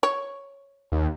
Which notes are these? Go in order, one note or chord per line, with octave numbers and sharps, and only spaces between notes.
C#5
D#2